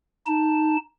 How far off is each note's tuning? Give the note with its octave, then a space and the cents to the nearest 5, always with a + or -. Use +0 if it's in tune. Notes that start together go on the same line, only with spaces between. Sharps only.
D#4 +0 A5 +5